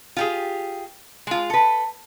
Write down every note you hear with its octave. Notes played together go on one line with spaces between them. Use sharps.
F4 G4 G#4
G#3 F4
A4 B4